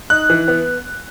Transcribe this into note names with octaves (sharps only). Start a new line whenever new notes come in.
D#4 F#6
E3
B3